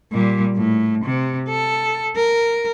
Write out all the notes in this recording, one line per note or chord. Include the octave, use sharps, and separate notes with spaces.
A#2 G3
A2
C3
A4
A#4